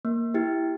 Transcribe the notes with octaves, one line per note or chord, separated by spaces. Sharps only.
A#3
E4 G4